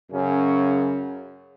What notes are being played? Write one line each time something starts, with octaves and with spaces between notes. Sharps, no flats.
F#2 C#3 C#4